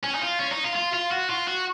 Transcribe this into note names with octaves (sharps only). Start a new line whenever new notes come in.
C#4
D#4
F4
C#4
D#4
F4
F4
F4
F#4
F4
F#4